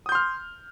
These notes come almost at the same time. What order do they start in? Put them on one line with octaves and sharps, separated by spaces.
D#6 G6 C6 F6